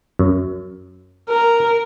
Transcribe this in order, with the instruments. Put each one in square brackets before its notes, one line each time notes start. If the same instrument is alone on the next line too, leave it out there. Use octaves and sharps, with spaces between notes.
[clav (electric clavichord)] F#2
[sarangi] A#4